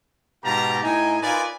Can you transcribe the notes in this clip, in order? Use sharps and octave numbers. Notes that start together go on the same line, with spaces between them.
G#2 B2 F4 G4 A5 A#5
A2 D#4 G5 G#5
D#4 F4 A#4 B4 D5 G#5